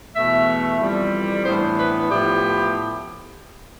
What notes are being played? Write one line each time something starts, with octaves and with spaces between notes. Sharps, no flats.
E2 B2 A3 E5
F2 E3 G3
A2 E3 B3 D4 C5
B4
A2 F3 B3 E4 G4